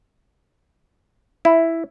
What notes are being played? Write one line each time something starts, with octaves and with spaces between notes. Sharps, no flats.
E4